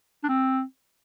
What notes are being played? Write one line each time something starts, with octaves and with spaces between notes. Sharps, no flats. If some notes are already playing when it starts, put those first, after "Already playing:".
D4
C4